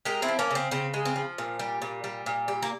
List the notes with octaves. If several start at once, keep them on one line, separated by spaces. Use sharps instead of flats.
G#3 G4 A#4
C4 E4
F3
A#3 C#4
C#3 C4
C#3 C4
G#3
C4
F3
A#2
G3
A#2
G3
A#2
G3
A#3